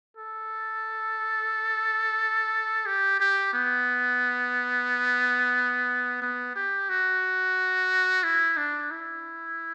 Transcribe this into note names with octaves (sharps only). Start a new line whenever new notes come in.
A4
G4
G4
B3
B3
G4
F#4
E4
D4
E4